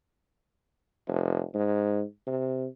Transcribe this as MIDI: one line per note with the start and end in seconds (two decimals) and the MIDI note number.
1.08 1.42 29
1.54 2.03 44
2.27 2.66 48